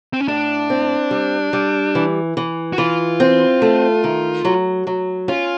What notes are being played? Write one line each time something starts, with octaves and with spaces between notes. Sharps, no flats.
C4
C#4
A2 D4
C4
G3
G3
E3
E3
F#4
E3 F4
C4
A3
D#3
F#3
F#3
C#4 F4